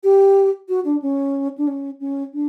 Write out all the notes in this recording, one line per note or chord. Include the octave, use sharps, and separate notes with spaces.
G4
F#4
D4
C#4
D4
C#4
C#4
D4